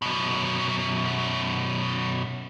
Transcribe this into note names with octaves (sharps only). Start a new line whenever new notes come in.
F#2 B2